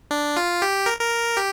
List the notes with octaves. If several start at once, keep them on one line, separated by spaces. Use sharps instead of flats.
D4
F4
G4
A#4
A#4
G4